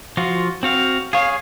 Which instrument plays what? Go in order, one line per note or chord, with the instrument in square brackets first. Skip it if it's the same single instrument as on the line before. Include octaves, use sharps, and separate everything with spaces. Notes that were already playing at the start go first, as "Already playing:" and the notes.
[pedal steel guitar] F3 F4 F#4
C4 F#4 F5
[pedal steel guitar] G#4 C#5 [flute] F5